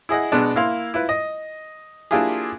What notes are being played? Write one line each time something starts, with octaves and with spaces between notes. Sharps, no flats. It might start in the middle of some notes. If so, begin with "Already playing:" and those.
E4 G#4 D#5 F#5
B2 G#3 B3 D4
A#3 E4 F5 C6
E4 F4 B4
D#5
A#3 D4 E4 F4 G4 G#4